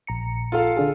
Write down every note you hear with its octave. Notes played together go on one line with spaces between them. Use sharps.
A#1 A#5 C#7
F4 A4 F5
D3 D4 G#4